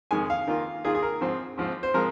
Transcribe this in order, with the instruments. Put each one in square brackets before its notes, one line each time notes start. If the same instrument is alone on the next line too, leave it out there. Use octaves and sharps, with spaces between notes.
[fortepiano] F2 D#3 G#3 G#5
F5
D#3 A#3 F4
D#3 A#3 F4 G#4
G#4
A#4
G#2 F3 C4
G#2 F3 C4
C5
F3 G#3 C4 A#4